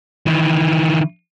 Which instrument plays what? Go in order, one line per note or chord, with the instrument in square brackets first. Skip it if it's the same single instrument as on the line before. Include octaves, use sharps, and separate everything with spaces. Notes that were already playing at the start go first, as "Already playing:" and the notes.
[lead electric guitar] D#3 E3